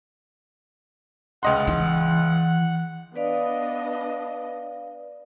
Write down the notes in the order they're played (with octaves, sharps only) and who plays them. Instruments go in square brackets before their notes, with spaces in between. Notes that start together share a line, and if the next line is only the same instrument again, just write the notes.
[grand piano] C#2 D#5 C6 [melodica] F#5
[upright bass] E3
[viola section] B3 D4 D#5 [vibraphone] B4 D5 F5